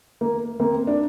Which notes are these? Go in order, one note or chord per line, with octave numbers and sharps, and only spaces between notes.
A#3
A#3 C4
D4